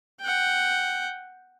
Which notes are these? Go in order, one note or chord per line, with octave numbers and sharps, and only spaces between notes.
F#5 G5